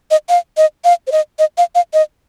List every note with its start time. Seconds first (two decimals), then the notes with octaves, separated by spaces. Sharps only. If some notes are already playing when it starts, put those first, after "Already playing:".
0.11 D#5
0.29 F5
0.57 D#5
0.84 F5
1.07 C5
1.12 D#5
1.39 D#5
1.58 F5
1.75 F5
1.93 D#5